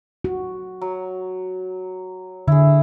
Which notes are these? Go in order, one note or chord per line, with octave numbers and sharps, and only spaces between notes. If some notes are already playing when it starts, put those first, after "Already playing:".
F#4
F#3
D3 E4 G#4